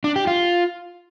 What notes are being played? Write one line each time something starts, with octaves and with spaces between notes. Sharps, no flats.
D4
G4
F4